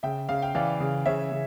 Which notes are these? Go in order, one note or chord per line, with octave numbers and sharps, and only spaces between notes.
C#3 E5 G5
C#3 F5
G5
E3 D5 F5
C#3
C#3 C#5 E5
C#3